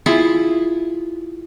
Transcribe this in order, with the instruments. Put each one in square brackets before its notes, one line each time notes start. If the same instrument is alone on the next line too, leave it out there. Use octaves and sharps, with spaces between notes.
[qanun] E4 F4 G#4